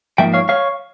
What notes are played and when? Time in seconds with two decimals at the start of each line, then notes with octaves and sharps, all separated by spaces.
0.18 G#2 F3 A#3 E5 G5
0.34 C#5 F5
0.49 C#5 F5